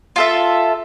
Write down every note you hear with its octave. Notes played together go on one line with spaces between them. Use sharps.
F4 A4 E5